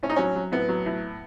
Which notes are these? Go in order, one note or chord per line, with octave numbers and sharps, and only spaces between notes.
A2 C#4
D#4
F#3 C#4
F#3
A2 B3
F#3
A2